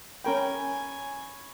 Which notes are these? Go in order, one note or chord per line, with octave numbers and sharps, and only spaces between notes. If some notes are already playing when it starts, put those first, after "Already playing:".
C#4 A#4 G5 G#5 B5 C#6